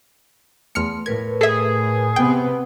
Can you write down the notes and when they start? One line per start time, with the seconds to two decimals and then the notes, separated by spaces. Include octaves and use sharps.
0.75 E2 A3 C6 F6 C#7
1.06 A2 A#4 B4 G#6
1.41 G#4 A4 E5
2.16 C3 B3 G5